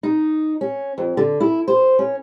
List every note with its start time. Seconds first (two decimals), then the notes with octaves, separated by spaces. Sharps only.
0.03 D#4
0.61 C#4
0.98 F2
1.17 D3
1.40 E4
1.68 C5
1.99 C#4